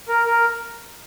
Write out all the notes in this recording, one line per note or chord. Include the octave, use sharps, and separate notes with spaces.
A#4
A#4